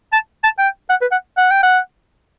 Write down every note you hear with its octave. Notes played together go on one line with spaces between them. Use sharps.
A5
A5
G5
F#5
B4
F#5
F#5
G5
F#5